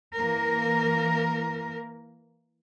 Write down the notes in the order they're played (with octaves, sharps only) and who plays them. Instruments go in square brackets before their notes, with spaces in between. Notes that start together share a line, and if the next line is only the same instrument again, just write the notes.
[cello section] E3 A#3 A#4